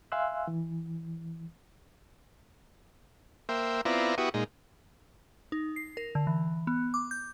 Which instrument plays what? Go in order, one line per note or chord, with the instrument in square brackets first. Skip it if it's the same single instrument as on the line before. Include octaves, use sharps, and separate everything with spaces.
[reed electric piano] E5 F5 G#5 C6 E6 F#6
E3
[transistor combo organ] A#3 C5 E5 G5
B3 C4 E4 F4 D5 A#5
B3 E4 F#4 G4 C#6 D#6
A#2 G#3 D#4
[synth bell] D#4
C7
A#4
D3
E3
B3
D6
G6